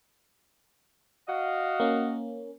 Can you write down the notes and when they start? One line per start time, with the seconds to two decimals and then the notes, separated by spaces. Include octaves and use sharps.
1.28 F#4 D#5 F5
1.80 A#3 C#4